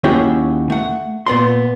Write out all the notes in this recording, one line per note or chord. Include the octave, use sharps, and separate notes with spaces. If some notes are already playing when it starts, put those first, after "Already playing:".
D#2 C#4 E4 F#4 G#4 G5
A3 F#5
A#2 B3 D5 C6